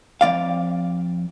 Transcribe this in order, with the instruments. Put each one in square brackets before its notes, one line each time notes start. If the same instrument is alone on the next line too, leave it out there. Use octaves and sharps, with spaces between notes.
[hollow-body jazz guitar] F2 F#3 D5 F5